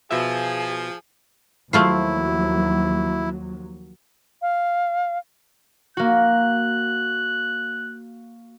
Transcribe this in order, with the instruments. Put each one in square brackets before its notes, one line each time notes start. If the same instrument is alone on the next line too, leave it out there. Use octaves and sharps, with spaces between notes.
[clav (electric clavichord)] B2 E5 [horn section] F3 [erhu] G#4
[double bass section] D#2 F3 F#3 [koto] A3 F4 C5 [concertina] E4
[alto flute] F5
[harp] A#3 F#4 [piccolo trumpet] F#6